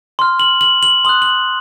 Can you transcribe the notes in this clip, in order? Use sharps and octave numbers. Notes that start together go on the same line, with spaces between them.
C6 F6
F#7
F#7
F#7
C6 D#6 F#6 F#7
F#7